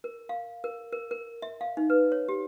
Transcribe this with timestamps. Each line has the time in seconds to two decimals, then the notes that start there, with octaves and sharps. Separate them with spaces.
0.04 A#4
0.29 F5
0.64 A#4
0.92 A#4
1.11 A#4
1.42 E5
1.61 F5
1.77 D#4
1.90 B4
2.12 C#5
2.29 G4